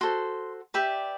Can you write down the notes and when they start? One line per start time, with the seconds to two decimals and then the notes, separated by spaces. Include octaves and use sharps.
0.01 F#4 A4 C5 C6
0.74 G4 B4 D5 E5